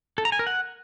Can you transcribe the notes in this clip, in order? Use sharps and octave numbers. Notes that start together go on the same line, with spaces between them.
A4
A#5
G#5
A#4
F#5